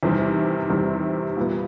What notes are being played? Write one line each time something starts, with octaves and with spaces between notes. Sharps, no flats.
E2 C3 D#3 G3 C4
E2 C3 D#3 G3 C4
A#2 G3 B3